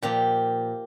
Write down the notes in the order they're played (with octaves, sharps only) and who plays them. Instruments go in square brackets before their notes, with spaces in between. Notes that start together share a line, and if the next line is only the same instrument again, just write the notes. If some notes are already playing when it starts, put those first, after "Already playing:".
[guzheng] A#2 F3 G4